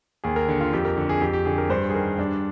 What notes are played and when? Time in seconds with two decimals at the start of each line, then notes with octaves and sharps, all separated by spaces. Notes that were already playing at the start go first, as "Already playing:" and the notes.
0.24 D#2 G#4
0.36 A#4
0.49 D3
0.61 F4
0.73 F2 G4
0.85 A#4
0.97 D3
1.09 G#4
1.21 F2 G4
1.33 G4
1.45 D3 G#4
1.58 A#4
1.70 G2 C5
1.90 G#4
1.94 D#3 A#4
2.18 G2 D4